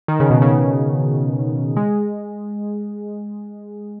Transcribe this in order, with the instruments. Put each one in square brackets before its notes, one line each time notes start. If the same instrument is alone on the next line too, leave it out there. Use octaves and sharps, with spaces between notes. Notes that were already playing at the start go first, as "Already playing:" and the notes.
[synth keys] D#3
C#3
B2
C#3
G#3